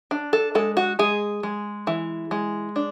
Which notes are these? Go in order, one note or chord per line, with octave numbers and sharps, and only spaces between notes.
D4
A4
G#3 A4
F#4
G#3 G#4
G#3
E3
G#3
D4